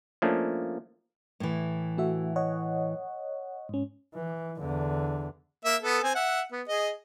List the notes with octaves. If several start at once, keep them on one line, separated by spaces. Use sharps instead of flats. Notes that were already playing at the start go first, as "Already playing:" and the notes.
F3 A3 A#3 C#4 D4
A2 E3
A3 F#4 E5
C#5 D#5 F#5
G#2 C#4
E3
E2 D3
A#3 E5
B3 A4
C4 G#5
E5 F#5
B3
G#4 D#5